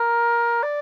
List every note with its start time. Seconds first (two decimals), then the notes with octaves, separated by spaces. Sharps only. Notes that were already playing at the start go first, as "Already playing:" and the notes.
Already playing: A#4
0.62 D5